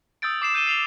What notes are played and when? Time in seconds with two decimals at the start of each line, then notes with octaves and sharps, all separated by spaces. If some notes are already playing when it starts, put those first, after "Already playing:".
0.22 D#6 E6 G6 A6 D7
0.42 D6 C7 E7
0.55 G6 D#7 E7 G7
0.67 C7 F7 G7